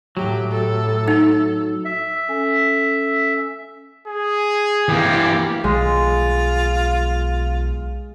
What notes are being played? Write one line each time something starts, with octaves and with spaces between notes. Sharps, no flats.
A2 F#3 G4
A4
D#4
E5
C#4 A4 G#5
G#4
E3 A#3 G4
B1 G#3 F4